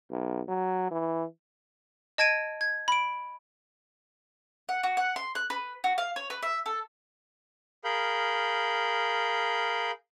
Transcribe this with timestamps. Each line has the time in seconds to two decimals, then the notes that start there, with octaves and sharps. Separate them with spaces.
0.11 B1
0.48 F#3
0.91 E3
2.18 D#5 A5 G#6 D7 D#7
2.61 G#6
2.88 B5 D7
4.69 F#5
4.83 F#4
4.97 F#5
5.16 C6
5.35 F#6
5.50 B4
5.84 F#4
5.98 F5
6.16 C#5
6.30 B4
6.43 E5
6.66 A4
7.84 G#4 A#4 F5 B5 G6